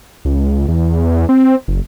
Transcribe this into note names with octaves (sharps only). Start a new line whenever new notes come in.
C#2
E2
C4
F#1